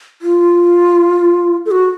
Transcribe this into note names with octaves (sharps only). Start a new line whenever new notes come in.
F4
A4
F#4